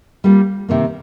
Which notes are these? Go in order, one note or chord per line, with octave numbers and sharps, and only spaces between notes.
G3 A#3 F4
C3 D#3 A#3